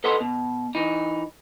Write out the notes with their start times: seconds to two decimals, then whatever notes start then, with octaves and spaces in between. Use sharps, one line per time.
0.04 A4 B4 D#5 F#5 C6
0.21 B2
0.75 E3 D#4